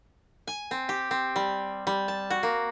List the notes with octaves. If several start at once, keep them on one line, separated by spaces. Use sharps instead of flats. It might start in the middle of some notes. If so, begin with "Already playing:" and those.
G#5
C4
G4
C4
G3
G3
A5
F#4
A#3